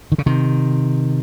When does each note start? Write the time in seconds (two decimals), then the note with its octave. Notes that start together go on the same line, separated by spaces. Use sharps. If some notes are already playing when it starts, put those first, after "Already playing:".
0.12 D#3
0.18 C#3
0.26 C3 D#3